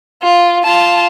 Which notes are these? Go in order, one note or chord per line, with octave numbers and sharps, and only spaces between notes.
F4
F4 A5